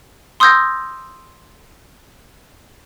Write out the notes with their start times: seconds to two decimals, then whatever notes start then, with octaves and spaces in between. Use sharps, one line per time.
0.40 C6 D#6 E6 G6 G#6 A#6